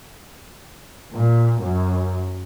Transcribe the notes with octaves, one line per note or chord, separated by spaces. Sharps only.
A#2
F#2